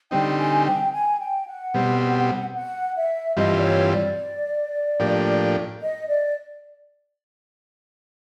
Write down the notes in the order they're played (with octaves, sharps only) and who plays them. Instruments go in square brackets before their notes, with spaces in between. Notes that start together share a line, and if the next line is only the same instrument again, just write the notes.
[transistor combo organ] D3 G3 C4 D#4 [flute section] G5
[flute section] G#5
G5
G#5
G5
F#5
[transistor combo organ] B2 G3 C4
[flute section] F#5
E5
[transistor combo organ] G2 E3 G3 C4 F4 [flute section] D#5
[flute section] D5
C#5
D5
[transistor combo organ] A2 F3 A#3 D4 G4
[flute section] D#5
D5